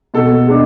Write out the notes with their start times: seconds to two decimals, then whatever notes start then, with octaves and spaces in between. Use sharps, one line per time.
0.14 B2 A4
0.47 G#3 D4